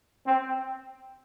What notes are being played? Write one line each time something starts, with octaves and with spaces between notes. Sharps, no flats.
C4